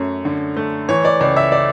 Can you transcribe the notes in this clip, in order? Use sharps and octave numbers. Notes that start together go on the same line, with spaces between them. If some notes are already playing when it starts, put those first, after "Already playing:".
Already playing: F#2 A3 C#5
D3
A3
E3 C#5
D5
C#2 D5
E5
D5